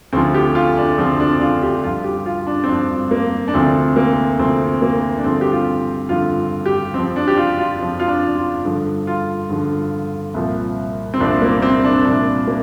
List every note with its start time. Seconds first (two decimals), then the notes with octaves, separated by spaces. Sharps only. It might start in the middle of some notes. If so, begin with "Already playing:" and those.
0.13 D2 D3 F3 C4
0.34 G4
0.55 F4
0.77 D4
0.98 D2 D3 F3 C4
1.20 D4
1.35 D4
1.41 F4
1.62 G4
1.83 G2 F3 F4
2.04 G4
2.26 F4
2.47 D4
2.64 C4
2.68 G2 F3 D4
3.11 A#3
3.48 D4
3.54 D2 C3 F3 C4
3.96 A#3
4.38 D2 C3 F3 C4
4.82 A#3
5.18 D4
5.24 G2 D3 F3 C4
5.41 G4
5.52 F4
6.09 G2 D3 F3 F4
6.66 G4
6.94 F2 F3 C4
7.16 D4
7.28 G4
7.37 F4
7.58 F4
7.79 F2 F3
8.00 F4
8.08 D4
8.36 F4
8.65 G2 D3 F3
9.07 F4
9.49 G2 D3 F3
10.34 C2 A#2 F3
11.14 C4
11.20 C2 A#2 F3 D4
11.42 A#3
11.62 C4
11.84 D4
12.05 C2 A#2 F3 D4
12.47 A#3